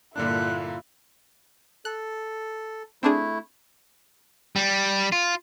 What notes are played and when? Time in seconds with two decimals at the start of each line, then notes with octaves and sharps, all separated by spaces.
0.16 G2 A#2 D3 A#3 D4 E4 F4 F#6
1.85 A4 F#6
3.03 A3 C4 D4 E4 G#4
4.56 G3
5.12 F4